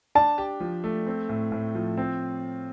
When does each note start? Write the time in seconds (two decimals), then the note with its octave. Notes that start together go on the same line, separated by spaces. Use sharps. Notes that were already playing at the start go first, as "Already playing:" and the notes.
0.15 D4 A5
0.38 G4
0.60 F3
0.84 A3
1.07 C4
1.29 A2
1.52 A2
1.75 F3
1.97 C4